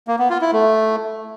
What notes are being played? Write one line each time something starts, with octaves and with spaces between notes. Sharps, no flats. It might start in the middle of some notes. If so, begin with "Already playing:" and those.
A#3
B3
F4
E4
A3